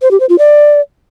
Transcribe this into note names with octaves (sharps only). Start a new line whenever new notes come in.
C5
G4
C5
F4
D5